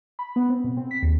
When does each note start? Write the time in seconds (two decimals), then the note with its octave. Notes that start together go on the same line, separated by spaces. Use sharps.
0.19 B5
0.36 B3
0.49 C4
0.64 B2
0.77 C4
0.91 B6
1.03 D#2